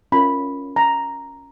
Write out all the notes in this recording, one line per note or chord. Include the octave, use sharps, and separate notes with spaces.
C#4 F4 A#4 B5
A#5